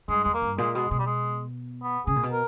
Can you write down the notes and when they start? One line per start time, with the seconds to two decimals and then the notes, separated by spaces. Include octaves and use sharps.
0.08 G2 G#3
0.23 E2 G#3
0.34 A#3
0.42 G2
0.58 A#2 G#3
0.75 B2 G#3
0.91 B2 G#3
0.99 G3
1.06 G#3
1.83 B3
2.07 C#3 G#4
2.16 A#2
2.23 B2
2.31 A#4